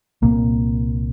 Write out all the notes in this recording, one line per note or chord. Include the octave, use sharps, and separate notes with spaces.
C2 A#2 A#3